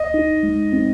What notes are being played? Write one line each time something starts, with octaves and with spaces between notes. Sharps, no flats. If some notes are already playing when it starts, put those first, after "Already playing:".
Already playing: D#5
D#4
G#3
C4